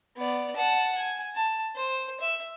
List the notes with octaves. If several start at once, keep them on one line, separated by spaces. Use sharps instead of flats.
B3 D5
F#5 A5
G#5
A5
C5
E5 E6